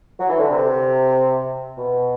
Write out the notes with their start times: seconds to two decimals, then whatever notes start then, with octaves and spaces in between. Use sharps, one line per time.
0.20 F#3
0.29 E3
0.40 D3
0.51 C3
1.78 B2